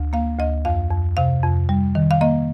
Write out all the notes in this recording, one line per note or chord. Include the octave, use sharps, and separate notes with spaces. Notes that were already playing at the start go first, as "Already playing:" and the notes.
Already playing: D2
A#3 F5
D2 D#5
F2 F5
F2
C3 F5
F2
G3
D#3
F5
A#3 D#5